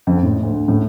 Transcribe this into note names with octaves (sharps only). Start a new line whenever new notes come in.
F2
A2
D2
A2